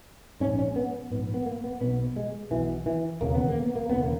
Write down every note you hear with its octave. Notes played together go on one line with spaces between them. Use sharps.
A#1 G#2 C#4
C#4
B3
A#1 G#2 B3
B3
A#3
B3
B1 B2 B3
G#3
B1 B2 E3
E3
E1 D#2 C#3 A#3
B3
A#3
B3
A#3
E1 D#2 C#3 B3
A#3